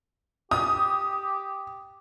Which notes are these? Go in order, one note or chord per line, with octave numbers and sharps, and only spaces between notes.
G4 D#6